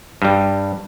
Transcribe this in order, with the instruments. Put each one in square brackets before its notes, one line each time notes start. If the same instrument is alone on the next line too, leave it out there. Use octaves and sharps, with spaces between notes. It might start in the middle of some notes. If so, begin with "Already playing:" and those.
[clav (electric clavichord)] G2 G3